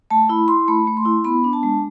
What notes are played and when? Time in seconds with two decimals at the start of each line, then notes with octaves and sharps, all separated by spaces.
0.10 A3 A5
0.29 E4 B5
0.48 E4 C6
0.68 A3 B5
0.87 A3
0.97 C6
1.05 E4
1.24 B3 B5
1.44 D4
1.53 A5
1.63 G#3